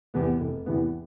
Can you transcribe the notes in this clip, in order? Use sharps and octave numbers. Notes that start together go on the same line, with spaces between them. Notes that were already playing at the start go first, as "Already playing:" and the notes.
E2 C3 E3 B3
F1
E2 C3 E3 B3